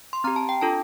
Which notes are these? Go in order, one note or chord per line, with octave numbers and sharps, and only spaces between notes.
C6
C4 G4 A#5
A5
G5
D4 F4 A4 A5